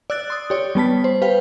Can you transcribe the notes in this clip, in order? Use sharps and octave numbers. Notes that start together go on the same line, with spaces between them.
D5 E6 F#6 A6
C6 D#6
G4 C#5 D5
G3 B3 A5 B6
C5
G4 B4 F5 G5